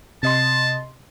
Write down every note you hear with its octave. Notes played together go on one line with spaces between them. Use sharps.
C3 D#5 A5 C6